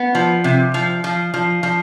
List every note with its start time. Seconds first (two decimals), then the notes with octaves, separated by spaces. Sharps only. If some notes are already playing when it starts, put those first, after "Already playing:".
Already playing: B3
0.15 F3
0.44 C3
0.74 F3
1.04 F3
1.34 F3
1.63 F3